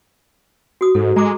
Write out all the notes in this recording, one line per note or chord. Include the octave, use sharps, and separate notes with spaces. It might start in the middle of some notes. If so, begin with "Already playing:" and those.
F#4 D#6
G#2 A4
G#3 A#5 D6